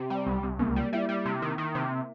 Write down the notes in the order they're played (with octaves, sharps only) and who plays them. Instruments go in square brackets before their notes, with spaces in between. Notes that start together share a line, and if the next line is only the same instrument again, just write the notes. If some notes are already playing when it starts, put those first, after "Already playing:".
Already playing: [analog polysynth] C3
G3
C2
C2
[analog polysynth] C#2 [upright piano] A#3
[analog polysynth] G3
[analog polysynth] G3 [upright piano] E4
[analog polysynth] G3
C3
D#3
D#3
C3